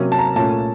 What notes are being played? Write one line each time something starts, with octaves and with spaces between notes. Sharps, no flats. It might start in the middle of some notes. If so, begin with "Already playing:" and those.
Already playing: C3 F#3 A#3 C#4
A5
A#5
A#2 A3 C#4 A5